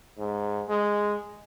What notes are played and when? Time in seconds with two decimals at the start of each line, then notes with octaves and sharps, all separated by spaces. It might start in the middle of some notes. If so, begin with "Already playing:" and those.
0.18 G#2
0.69 G#3